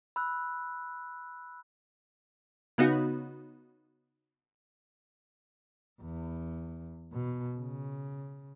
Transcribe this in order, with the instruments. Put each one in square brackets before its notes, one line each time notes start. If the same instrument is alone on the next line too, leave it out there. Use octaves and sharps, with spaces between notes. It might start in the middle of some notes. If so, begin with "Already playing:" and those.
[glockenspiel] B5 E6 F#6
[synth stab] C#3 B3 D#4 F#4
[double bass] E2
B2
C#3